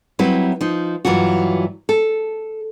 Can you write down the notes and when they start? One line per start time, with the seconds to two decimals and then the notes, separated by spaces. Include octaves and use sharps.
0.19 F#3 G3 C4 E4 B4
0.61 F3 D#4
1.05 G2 E3 F#3 F4 F#4
1.89 A4